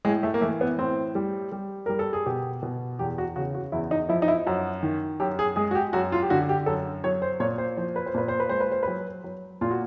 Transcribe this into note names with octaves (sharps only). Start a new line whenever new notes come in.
A2 G#3
A3
A#3
E3 A3
B3
A2 C4
G3
G3
G3 A#4
A4
G#4
B2 G4
B2
E2 G4
F#4
C#3 F#4
F#4
E2 E4
D#4
F3 E4
D#4
E4
F#2 F#4
D#3
F#2 G4
G#4
G#3 G#4
F#4
G4
F#2 F#4
F4
G4
D3 F#4
G4
F#2 A4
F#3 C#5
C5
A#2 C#5
C5
F3 C5
B4
C5
A#2 B4
C5
B4
G#3 C5
B4
C5
F#3 B4
F#3
A#2 F4
F#4